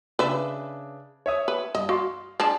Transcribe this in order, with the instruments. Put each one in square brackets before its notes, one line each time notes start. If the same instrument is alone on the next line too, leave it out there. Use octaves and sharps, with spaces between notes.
[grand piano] C#3 D4 [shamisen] B4 E5
[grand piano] C#5 E5 D#6
[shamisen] B4
[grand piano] G2 [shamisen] D#5
[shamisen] F#4 [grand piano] F5 C6
[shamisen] G#3 D4 A5